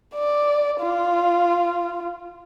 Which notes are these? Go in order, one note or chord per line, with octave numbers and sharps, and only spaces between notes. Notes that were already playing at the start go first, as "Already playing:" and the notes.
D5
F4